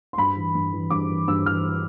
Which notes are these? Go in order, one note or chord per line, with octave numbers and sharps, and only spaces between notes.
C6
G2 B5
E3
G2
E3
G2 D6
E3
G2 E6
E3 F6